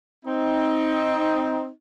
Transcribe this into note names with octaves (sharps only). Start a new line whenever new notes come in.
C4 D#4